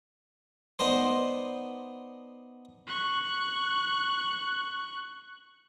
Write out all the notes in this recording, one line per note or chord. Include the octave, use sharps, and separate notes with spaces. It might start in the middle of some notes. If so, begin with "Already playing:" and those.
B3 D4 D#4 C5
C#6 F#6